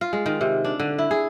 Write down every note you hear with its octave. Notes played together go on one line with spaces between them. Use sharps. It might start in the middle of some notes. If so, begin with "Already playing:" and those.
F4
G#3
D#3
C3
D4
D3
E4
G#4